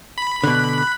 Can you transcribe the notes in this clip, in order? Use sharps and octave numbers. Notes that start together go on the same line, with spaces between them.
B5
B2 D3 F#6